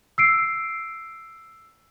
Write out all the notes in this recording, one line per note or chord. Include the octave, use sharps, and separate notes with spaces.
E6 C7 D7